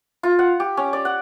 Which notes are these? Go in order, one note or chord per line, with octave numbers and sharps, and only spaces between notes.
F4
F#5
G4
C#4
D5
F#5